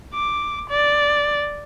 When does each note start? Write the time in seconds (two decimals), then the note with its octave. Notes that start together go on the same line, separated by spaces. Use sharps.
0.14 D6
0.70 D5